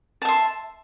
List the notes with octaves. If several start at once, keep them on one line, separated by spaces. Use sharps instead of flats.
E5 A5 C6